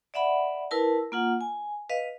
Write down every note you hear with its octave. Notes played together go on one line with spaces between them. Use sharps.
D5 E5 F#5 B5
E4 A#4 B4 A5
A#3 F4 F#5
G#5
B4 D#5 F5